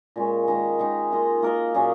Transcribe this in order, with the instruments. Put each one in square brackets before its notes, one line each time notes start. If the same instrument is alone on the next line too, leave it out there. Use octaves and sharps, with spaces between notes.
[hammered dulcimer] A#2 G#3 C#4
D#3 G#3 D#4
D#3 G#3 D#4
A#3 F4 A#4 D#5
A#3 F4 A#4 D#5
A#2 F#3 C#4 G#4